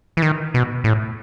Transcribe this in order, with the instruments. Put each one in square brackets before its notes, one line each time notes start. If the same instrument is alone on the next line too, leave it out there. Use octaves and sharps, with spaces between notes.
[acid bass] E3
D#3
B2
A2